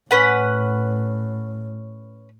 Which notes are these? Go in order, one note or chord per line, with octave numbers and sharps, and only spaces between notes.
A2 C#4 B4 F#5